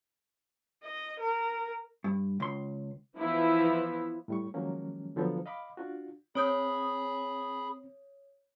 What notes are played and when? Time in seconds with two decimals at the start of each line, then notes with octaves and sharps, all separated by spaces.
0.83 D#5
1.19 A#4
2.04 G2
2.40 C#2 C6
3.16 E3 F3 B3 E4
4.28 A2 G3 C#6
4.54 D#3 F3 F#3 G#3 A#3 C#4
5.16 D3 F3 F#3 B3 A4
5.46 D#5 F5 B5 D6
5.77 D4 F4 F#4
6.35 C4 G#4 C#5 B5 D#6 G6